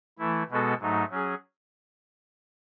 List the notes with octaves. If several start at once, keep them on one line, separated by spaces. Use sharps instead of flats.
E3 A3 E4
B2 G#3 B3 F#4 A4
G#2 F#3 A3 D#4
F#3 C#4 G#4